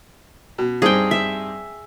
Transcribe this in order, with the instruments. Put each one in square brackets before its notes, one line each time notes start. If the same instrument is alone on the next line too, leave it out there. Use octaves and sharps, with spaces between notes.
[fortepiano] B2
[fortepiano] G2 C4 D#4 [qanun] G#4 G5
[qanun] E5